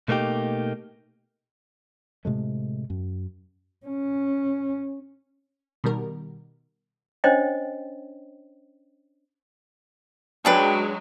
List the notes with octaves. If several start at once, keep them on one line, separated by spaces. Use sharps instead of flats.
B2 A3 A#3 D#4 G4
A2 C3 G#3 A3
F#2
C#4
B2 D#3 G3 A#4
C#4 D4 C5 C#5 D#5 G5
F#3 G#3 C#4 D4 B4 G5